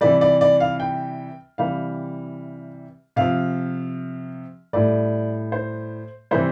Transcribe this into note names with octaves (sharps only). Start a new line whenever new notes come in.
C3 E3 G3 D5
D5
D5
F5
G5
C3 E3 G3 F5
C3 F3 F5
A2 G3 D5
C5
C3 E3 G3 C5